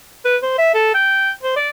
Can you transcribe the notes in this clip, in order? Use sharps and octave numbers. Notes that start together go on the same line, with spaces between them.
B4
C5
E5
A4
G5
C5
D5